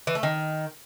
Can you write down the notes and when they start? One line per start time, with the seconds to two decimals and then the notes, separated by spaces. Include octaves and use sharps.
0.07 E3
0.15 A3
0.23 D#3